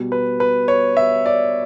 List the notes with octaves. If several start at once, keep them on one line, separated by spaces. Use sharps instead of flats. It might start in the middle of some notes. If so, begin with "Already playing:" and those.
Already playing: B2 G3
B4
B4
C#5
E5
D5